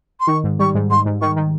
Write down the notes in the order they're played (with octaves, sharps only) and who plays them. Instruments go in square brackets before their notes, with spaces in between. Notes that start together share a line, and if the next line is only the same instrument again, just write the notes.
[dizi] C6
[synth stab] D#3 [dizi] C#6
[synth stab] G#2
[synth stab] G3 [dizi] C#6
[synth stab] G#2
[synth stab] G#2 [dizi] C6
[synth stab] G#2
[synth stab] D#3 [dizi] C#6
[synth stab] D#3